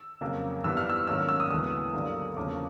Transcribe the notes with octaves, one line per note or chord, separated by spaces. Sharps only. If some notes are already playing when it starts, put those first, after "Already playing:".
Already playing: E6
F2 C#3 F#3 A#3
G2 E3 G3 B3 E6
F6
E6
G#2 D#3 F#3 A#3 C#4 E6
F6
E6
D#6
D2 C#3 E3 G#3 B3 D#6
G2 D3 F#3 A#3
E2 C#3 F3 A#3 C#4 D6